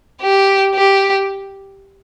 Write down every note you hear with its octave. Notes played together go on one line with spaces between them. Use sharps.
G4
G4